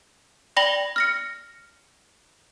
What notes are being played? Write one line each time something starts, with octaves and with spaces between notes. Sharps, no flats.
D5 G5 B5 A#6 F#7 G7
F6 A#6 C#7